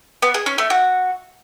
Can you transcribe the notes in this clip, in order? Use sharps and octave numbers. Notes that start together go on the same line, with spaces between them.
B3
G#4
C#4
A3
F#4